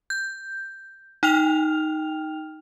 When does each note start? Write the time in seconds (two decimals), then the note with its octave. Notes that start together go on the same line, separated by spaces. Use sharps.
0.10 G6
1.23 D#4 G5 F6 F7